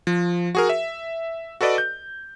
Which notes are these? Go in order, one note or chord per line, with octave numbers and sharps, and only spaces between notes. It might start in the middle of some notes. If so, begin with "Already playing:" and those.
F3
F#4 G#4 A#4
E5
F#4 A4 B4 D5 D#5
G6